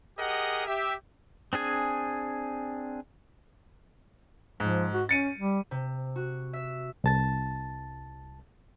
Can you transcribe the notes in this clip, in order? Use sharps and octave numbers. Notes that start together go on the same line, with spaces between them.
G4 G#4 A#4 D#5 F#5
G4 E5
C4 D4 G#4 G#5
G#2 F3
F#4
C#4 A6 C#7 D#7
G3
C3
F#4
E5
C2 A5 A6